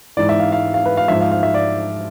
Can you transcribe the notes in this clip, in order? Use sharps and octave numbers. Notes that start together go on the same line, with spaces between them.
G#2 E3 D5
E5
F5
F5
F5
B4
F5
G#2 F3 E5
F5
F5
E5
D5